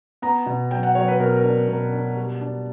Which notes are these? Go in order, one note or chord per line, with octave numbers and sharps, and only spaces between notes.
B3 A#5
B2
F#3 G5
F#5
F#3 C#5
B4
B2 A#4
A#4
D4
B2 A#4
D4
G3
D4